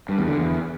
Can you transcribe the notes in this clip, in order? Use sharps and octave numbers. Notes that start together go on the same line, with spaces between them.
G2
E2
D3
E2